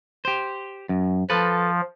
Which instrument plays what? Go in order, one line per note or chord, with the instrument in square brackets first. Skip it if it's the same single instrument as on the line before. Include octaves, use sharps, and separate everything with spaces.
[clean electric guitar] G4 C5
F#2
[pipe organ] F3 [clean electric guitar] A4 B4